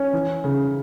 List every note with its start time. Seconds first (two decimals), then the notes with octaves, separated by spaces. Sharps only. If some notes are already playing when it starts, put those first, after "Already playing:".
Already playing: C#4
0.13 E3
0.44 C#3